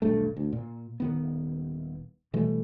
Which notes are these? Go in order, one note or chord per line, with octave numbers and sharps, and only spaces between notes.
D#1 B1 G2 A3
D2
A#2
D#1 D#3 B3
B2 E3 G3 A3